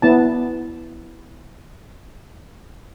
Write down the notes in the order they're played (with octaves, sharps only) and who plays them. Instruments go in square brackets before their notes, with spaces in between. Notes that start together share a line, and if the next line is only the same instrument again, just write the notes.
[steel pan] B3 E4 A5